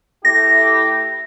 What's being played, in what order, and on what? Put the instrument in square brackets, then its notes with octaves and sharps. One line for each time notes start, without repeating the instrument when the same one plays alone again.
[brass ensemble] A3 E4 G4 [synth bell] A#6